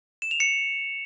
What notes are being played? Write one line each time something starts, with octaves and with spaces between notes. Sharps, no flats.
E7
F7
C#7